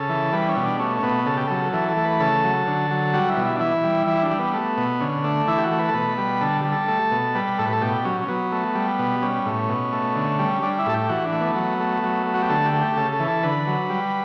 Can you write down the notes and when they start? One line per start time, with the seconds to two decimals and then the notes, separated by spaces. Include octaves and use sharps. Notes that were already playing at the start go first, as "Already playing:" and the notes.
Already playing: C#3 A4
0.09 E3
0.33 G3 B4
0.49 C#4
0.56 B2
0.64 D4
0.80 A3 C#4
0.97 C#4
1.03 B2 B3
1.26 C#3 A4
1.37 G4
1.47 F#3 A4
1.73 E3 A4
1.89 A4
1.97 A3
2.05 B4
2.20 C#3 A4
2.44 F#3
2.67 D3
2.91 F#3
3.13 G3 F#4
3.29 E4
3.37 B2
3.44 E4
3.56 D4
3.60 E3 E4
3.84 G3
4.07 E3 E4
4.22 D4
4.31 G3
4.39 B3
4.54 A3
4.77 B2
5.01 D3 C#4
5.24 A3 D4
5.48 E3 E4
5.58 G4
5.64 F#4
5.72 A3
5.79 B4
5.89 A4
5.94 B2 B4
6.18 G3
6.41 D3 A4
6.65 G3
6.72 A4
6.88 A3
7.11 B2
7.35 G3 B4
7.59 A2 A4
7.66 B4
7.73 A4
7.81 B2 G4
8.05 F#3 C#4
8.21 C#4
8.28 F#3 B3
8.52 A3
8.75 G3
8.99 B2
9.22 G3 C#4
9.46 A2
9.69 B2
9.92 A3
10.16 D3
10.39 G3
10.62 G3 D4
10.79 E4
10.86 A2 A4
10.94 G4
11.09 E3 F#4
11.25 D4
11.33 A3
11.40 B3
11.56 F#3
11.80 A3
12.04 F#3
12.26 A3
12.34 F#4
12.42 G4
12.50 D3 A4
12.65 G4
12.74 A3
12.81 G4
12.97 C#3 A4
13.12 A4
13.20 E3
13.28 A4
13.43 D3 B4
13.67 F#3
13.90 G3